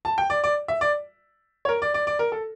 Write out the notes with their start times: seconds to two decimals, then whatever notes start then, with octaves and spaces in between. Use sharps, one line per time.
0.05 A5
0.18 G5
0.30 D5
0.44 D5
0.68 E5
0.81 D5
1.65 C#5
1.69 A#4
1.82 D5
1.94 D5
2.07 D5
2.19 A#4
2.32 A4